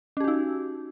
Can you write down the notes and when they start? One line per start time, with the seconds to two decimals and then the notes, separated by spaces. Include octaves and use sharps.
0.17 C#4
0.20 G4
0.24 F#4
0.28 D#4